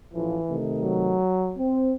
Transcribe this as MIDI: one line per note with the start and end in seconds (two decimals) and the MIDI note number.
0.14 0.37 33
0.14 0.37 45
0.14 0.58 52
0.14 0.37 53
0.48 1.20 48
0.48 1.20 51
0.48 1.20 57
0.80 1.57 54
1.58 1.93 60